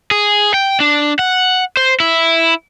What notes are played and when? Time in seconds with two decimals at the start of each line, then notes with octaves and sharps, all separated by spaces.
0.11 G#4
0.54 G5
0.80 D4
1.19 F#5
1.77 C5
2.00 E4